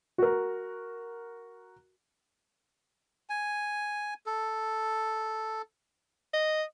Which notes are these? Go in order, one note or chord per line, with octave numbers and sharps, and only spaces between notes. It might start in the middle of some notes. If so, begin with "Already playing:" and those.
F#4 A#4
G#5
A4
D#5